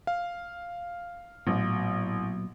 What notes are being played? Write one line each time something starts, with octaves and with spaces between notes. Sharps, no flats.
F5
A1 A#2 F#3 B3